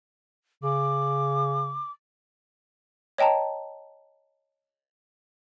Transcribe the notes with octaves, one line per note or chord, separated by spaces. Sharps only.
C#3 D6
C#5 D#5 G5 A5 A#5